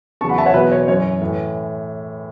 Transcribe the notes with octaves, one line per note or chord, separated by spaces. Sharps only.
E2 C#3 F#3 A5 C#6
F#5 B5
E5 A5
C#5 F#5
E2 B2 F#3 B4 E5
C#5
F#2 E3 C#5
A2 E3